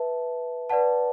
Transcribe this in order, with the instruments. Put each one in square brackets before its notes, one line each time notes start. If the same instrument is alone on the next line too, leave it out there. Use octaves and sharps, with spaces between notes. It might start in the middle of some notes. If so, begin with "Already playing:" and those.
Already playing: [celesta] B4 E5 A5
B4 D5 F#5 A5